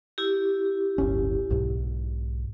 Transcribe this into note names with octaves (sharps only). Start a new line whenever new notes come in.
E4 G4
D1 G1 C#4
B1 G#2 B2